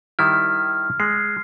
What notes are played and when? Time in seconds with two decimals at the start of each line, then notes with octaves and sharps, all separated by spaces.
0.19 D#3 G3 E4 F6
1.00 G#3 C7